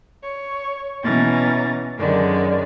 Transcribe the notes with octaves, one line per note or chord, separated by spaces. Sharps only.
C#5
B2 E3 C#4 A#5 A6
F#2 D3 D#3 G#3 D5